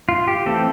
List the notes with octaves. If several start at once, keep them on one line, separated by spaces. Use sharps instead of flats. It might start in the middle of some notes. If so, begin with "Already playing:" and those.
F4
G4
E3 A3 C4 A4